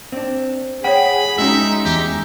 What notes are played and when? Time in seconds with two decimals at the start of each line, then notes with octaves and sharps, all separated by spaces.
0.12 C4 D4
0.84 G#4 C#5 F#5 G5 B5
1.38 G#3 C#4 D#4 F#4 E5
1.85 E2 G4